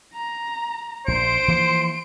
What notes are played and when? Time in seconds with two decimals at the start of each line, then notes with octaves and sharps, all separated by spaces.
0.14 A#5
1.08 A#1 C5 C6 D7
1.48 E3 F3 A#3